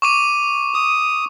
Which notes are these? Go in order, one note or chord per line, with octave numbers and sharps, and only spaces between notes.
C#6 D6 D#7
D#6